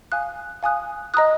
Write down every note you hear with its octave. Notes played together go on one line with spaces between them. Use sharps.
F5 G#5 D#6 F#6
F5 G#5 D#6 F#6
D#5 A#5 D#6 F#6